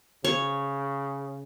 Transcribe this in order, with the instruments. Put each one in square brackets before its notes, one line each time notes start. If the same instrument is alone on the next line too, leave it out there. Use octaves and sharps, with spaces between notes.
[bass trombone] C#3 [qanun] C#5